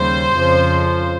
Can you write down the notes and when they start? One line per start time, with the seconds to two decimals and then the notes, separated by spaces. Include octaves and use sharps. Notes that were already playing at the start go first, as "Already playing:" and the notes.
Already playing: D#2 C#3 G3 C5
0.35 F2 C#3 F3